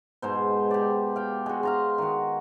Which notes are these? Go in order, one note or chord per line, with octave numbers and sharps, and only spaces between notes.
G#2 B2 C5
G4 D5
F5 G5
G#3 F#4
F5 A#5 C6
D#3 F#4